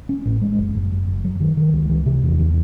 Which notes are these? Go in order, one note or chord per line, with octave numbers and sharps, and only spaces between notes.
C#4
A1
G#3
F#1
F#1
F#1
F#1
F#3
D#3
D#3
C#2
E3
C3
E2
E3